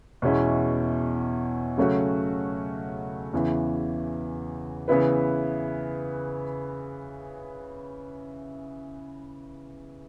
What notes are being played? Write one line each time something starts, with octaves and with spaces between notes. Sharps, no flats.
E2 B2 G#3 C#4 E4
C#3 F#3 A3 C#4 F#4
E2 C#3 E3
C#3 E3 B3 E4 B4